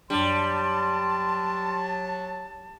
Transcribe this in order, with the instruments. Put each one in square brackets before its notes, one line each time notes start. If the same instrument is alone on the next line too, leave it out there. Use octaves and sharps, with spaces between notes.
[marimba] F#2 D4 [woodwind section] F#3 A5 [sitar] G3 [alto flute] C6